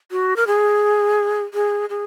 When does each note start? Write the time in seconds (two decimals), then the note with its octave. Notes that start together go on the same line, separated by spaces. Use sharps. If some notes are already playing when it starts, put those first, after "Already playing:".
0.11 F#4
0.36 A#4
0.47 G#4
1.54 G#4
1.90 G#4